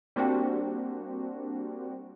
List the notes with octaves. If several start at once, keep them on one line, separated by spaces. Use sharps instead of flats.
G3 A#3 C4 D4 F#4 G4